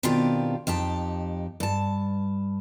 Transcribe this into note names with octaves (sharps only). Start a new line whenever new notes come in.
B2 D#3 C4 D4 F4 G4
F2 D#4 G4 A5
G2 A5